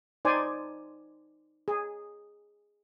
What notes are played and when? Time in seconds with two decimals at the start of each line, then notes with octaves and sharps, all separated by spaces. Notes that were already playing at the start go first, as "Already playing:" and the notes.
0.25 D#4 C5 D5 G#5
1.68 G#4